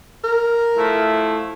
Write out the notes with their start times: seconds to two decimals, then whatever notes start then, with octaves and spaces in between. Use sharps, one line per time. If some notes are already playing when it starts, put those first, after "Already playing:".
0.24 A#4
0.75 F3 A3 E4